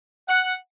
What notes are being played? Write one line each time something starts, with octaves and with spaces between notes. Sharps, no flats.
F#5